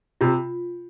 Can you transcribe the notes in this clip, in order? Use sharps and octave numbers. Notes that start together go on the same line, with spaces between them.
C3 F4